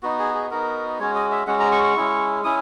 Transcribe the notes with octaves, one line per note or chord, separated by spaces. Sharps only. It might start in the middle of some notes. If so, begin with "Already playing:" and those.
B3 D#4 F#4
G#4
G#4
B3 D#4 F#4 A#4
G#3 C#4 F#4 C#5
D#5
E5
G#3 C#4 F#4 F#5
A#5
C#6
C#6
G#3 C#4 E4
C#4 E4 D#6